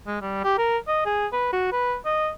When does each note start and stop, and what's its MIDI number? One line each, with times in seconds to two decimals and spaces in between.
0.07 0.16 56
0.21 0.39 55
0.44 0.55 67
0.58 0.77 70
0.88 1.06 75
1.06 1.26 68
1.32 1.49 71
1.53 1.69 66
1.72 1.96 71
2.05 2.30 75